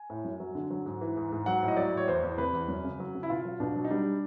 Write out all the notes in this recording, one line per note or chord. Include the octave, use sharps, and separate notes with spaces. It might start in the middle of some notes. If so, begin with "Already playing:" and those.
Already playing: G#5
A2
F#2
F#3
D3
F#3
G#2
E3
G#2
G#2
F#3 F#5
A2
D#5
F#3 D5
A2
C#5
E2 C5
E2
C3 B4
E2
F#2
C#3
F#3
C#3
E4
B2 F4
F#3
B2 D4
F#3
D#4
G3 D4